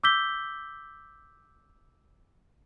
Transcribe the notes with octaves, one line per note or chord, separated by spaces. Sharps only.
D6 E6 G6 B6 G7